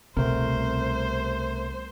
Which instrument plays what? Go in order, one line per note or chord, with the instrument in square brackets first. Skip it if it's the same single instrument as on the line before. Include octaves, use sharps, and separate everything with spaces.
[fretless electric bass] C2 C4 [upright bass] B2 [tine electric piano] A3 A#4 [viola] C5